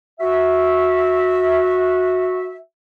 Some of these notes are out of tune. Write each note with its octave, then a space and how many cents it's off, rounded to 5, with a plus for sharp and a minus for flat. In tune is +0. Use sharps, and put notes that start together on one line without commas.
F#4 -15 E5 -15